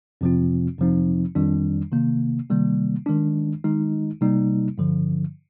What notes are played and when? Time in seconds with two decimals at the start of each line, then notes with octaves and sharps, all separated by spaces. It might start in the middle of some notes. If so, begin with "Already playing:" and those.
0.21 F2 C3 F3 C4 F4
0.78 F2 C3 F3 C4 D#4
1.35 F2 D#3 G3 D4
1.92 C3 D#3 A#3
2.50 C3 D#3 G3 A#3
3.06 D#3 G#3 D4
3.64 D#3 G#3 D#4
4.21 C3 G3 A#3 D#4
4.78 G2 D3 F3